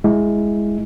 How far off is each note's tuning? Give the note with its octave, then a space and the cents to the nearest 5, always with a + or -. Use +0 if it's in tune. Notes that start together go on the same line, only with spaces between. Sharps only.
G#3 +0 E4 +0